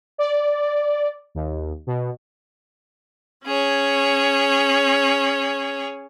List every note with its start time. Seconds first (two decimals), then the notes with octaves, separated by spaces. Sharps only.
0.18 D5
1.35 D#2
1.87 B2
3.45 C#4 G#4 C#5